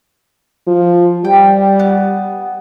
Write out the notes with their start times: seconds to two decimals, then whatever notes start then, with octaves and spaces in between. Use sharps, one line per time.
0.67 F3
1.25 G3 G5
1.79 B3